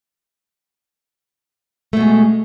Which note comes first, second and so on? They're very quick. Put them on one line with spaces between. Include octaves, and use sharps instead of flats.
A3 B2 G#3